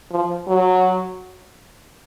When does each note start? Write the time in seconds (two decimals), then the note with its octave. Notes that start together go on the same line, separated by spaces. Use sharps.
0.11 F3
0.48 F#3